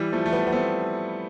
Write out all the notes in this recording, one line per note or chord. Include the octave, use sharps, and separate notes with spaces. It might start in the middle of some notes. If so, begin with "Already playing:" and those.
Already playing: E3 G3
F3 A3
A3
G3 B3
B3
A3 C4